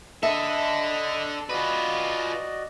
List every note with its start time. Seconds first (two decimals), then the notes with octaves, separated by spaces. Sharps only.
0.23 D4 A4 D#5 E5 B5 D#6
1.49 F4 F#4 B4 D5 D#5